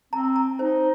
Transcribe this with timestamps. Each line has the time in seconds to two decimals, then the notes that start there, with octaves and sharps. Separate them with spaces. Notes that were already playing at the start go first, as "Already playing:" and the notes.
0.13 C4 A#5
0.36 A#5
0.59 D#4 C5